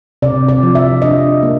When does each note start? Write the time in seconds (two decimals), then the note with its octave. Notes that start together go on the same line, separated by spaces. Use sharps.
0.22 C3 D5
0.49 D5
0.63 F3
0.75 E5
1.02 D4 D#5
1.43 A#3